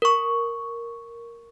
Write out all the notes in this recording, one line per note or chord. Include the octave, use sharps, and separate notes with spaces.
A#4 C#6